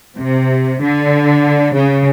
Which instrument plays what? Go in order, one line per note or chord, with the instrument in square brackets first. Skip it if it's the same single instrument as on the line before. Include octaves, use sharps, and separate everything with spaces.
[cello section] C3
D3
C#3